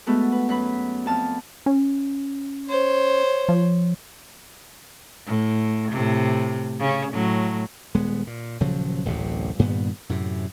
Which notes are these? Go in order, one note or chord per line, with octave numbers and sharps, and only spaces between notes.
G#3 A3 B3 F#4 A4
B4
F#2 B4 B5
F2 A5 F6
C#4
C5 C#5
F3
A2
A2 C3
C#3 C#4
A2 F#3
D#1 G#3 B3
A#2
D#1 C#3 F3 F#3
D1 A1 F#2 C3
G2 A#2 D#3 B3
F#2 A2 C3